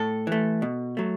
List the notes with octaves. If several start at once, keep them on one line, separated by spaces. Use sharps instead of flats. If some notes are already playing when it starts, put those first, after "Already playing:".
Already playing: A2 A4
E3 A3
B2
F#3 A3